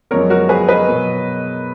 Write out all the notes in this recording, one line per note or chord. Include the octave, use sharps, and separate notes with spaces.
F#2 F3 G#3 B3 A#4 C#5
F#4 A#4
G#4 B4
B4 D#5
B2 F#3 B3